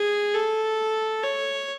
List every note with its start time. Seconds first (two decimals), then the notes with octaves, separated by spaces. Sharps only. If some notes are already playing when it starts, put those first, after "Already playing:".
Already playing: G#4
0.34 A4
1.23 C#5